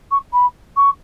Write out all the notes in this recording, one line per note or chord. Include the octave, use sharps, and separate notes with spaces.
C#6
B5
C#6